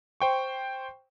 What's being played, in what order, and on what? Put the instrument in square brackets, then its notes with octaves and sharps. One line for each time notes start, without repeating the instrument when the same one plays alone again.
[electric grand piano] C5 G5 C#6